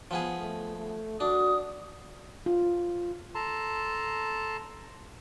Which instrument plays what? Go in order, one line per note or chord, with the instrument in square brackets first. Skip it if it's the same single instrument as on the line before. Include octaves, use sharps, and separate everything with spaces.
[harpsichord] F3 B3 G#4
[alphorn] A3
A3
[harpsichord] D4 [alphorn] F#4 [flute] D#6
[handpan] F4
[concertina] A4 A5 A#5 C6